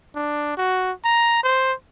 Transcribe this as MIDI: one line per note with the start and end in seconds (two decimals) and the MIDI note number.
0.15 0.56 62
0.58 0.92 66
1.04 1.42 82
1.43 1.73 72